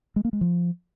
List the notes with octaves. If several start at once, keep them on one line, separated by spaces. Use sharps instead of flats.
G#3
A#3
G#3
F3